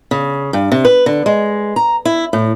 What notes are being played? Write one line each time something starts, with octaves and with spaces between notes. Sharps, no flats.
C#3
G2
C3
B4
D3
G#3
A#5
E4
A2